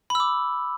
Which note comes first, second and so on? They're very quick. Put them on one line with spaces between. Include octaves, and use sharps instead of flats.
B5 E6 D6